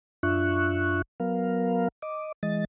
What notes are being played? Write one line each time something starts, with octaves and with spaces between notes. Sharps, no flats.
F#2 D4 F4 E5 C#6 F#6
F#3 B3 A#4 F5
D#5 D6
E3 G#3 D#5 A6